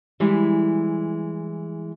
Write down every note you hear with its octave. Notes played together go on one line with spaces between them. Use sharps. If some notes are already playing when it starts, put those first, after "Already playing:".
E3 G3 G#3 E4